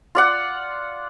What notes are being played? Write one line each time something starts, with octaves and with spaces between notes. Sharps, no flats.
F4 D5 F#5